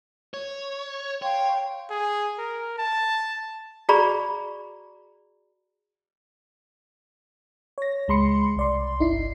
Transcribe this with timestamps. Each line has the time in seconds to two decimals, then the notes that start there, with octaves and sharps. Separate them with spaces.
0.34 C#5
1.22 C#5 F5 G5 C6
1.90 G#4
2.39 A#4
2.78 A5
3.89 F#4 G#4 D5 A#5 B5 C#6
7.78 C#5 A#6
8.08 C#2 G#3 B5 C6 C#7
8.57 C2 D5 C6
9.00 G1 D#4 E4 C7